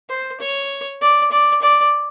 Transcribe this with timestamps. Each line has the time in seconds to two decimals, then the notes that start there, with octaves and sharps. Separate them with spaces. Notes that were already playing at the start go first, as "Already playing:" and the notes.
0.10 C5
0.41 C#5
1.01 D5
1.32 D5
1.62 D5